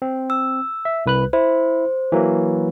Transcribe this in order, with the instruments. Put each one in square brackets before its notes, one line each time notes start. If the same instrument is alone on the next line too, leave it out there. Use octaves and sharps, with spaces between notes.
[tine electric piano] C4
[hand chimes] E6
[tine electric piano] E5
C2 B4 F#6
[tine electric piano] E4 [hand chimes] C5
[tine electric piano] E3 F#3 A#3